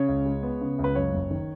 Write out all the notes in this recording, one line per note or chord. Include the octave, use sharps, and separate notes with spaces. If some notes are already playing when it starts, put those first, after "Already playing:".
Already playing: C#3 C#5
C#2
G#3
B3
C#3
C#2
B4
F#2 C#5
F#1
D#3